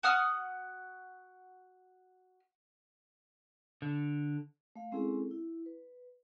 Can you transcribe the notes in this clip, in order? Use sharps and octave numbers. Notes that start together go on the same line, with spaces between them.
F#4 F#5 D#6 F6
D3
A3 F5
G#3 C4 C#4 E4 G#4 A4
E4
B4